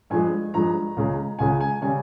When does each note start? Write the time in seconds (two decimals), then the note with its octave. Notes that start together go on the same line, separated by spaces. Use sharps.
0.10 G2 F3 G#3 G#5
0.54 G2 F3 G#3 A#5
0.96 C#2 C#3 G#3
1.39 C#2 C#3 G#3 G#5
1.60 G#5
1.81 C#3 G3 G#5